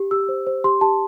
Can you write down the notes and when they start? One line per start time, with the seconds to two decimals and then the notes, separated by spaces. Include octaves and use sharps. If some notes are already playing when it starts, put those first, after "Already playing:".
Already playing: G4
0.11 G4 E6
0.29 C5
0.47 C5
0.64 G4 C6
0.81 G4 A5